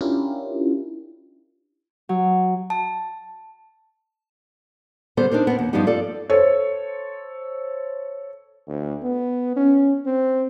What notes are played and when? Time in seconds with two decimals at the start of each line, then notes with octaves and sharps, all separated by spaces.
0.01 C#4 D4 E4 F4 G4 A#4
2.09 F#3
2.70 A5
5.17 D3 G3 B3 A4 C5
5.31 D4 D#4 A#4 C5
5.47 B3 C4
5.59 D#2
5.73 G2 F3 G3 B3 D#4 G4
5.87 F4 A4 D5
6.30 A4 C5 C#5
8.67 D2
9.02 B3
9.56 C#4
10.06 C4